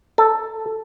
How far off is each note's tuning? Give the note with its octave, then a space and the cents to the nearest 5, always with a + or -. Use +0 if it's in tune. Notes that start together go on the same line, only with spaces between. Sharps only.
A4 +0